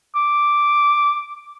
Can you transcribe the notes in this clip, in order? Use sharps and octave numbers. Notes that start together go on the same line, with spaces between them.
D6